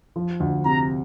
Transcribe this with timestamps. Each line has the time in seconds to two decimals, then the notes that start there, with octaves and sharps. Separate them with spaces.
0.16 F3
0.40 D2
0.65 C3 A#5